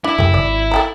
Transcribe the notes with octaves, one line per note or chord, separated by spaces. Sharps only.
D4 E4
F#2 C#3 A3 G4
G#1 D5
A4 G5 A#5